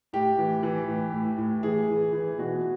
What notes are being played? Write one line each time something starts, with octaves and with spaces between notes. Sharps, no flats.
A2 G4
E3
E3
A2
A2
A2
E3 G#4
E3
E3
B2 F#4